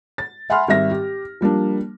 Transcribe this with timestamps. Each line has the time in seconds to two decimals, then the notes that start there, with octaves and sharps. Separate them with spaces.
0.18 A6
0.50 E5 F#5 G#5 B5 C6 F6
0.68 G#1 G3 E5 A#6
0.91 G4
1.41 F3 G3 A#3 D4